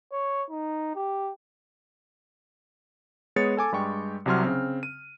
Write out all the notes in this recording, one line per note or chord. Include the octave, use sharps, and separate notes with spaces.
C#5
D#4
G4
G#3 B3 G#4 C#5 A6 C#7
A4 G#5 D6
G2 G3 G#3 G4 G5 C#6
C2 C3 F#3 C6 F6
C#3 C4
D#7